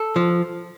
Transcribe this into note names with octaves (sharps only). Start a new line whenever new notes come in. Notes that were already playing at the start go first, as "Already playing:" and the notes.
Already playing: A4
F3